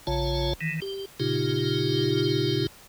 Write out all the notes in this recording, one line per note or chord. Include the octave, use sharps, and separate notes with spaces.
A#1 C#3 F4 C#5 A5
D#3 E3
G4
A#2 C#3 D#4 F4 G4